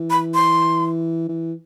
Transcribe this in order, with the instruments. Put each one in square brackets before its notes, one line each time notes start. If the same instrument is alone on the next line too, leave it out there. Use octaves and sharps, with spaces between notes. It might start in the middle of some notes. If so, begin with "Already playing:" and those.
Already playing: [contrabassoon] E3
[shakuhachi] B5
C6
[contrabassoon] E3